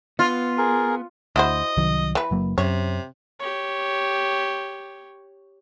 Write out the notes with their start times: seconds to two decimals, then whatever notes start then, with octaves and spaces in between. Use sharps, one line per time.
0.19 B3 F4
0.58 G#4 A#4
1.36 D2 E4 F#4 C5 D#5
1.77 C2 D#3 F#3
2.15 E3 B4
2.31 F#1 F#3 A#3
2.58 F#2 C3 C#5
3.39 G4 C#5